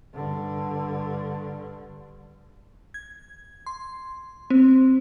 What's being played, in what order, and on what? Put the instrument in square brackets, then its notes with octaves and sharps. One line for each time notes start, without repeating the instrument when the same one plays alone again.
[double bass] G2 D3
[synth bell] G#6
C6
C4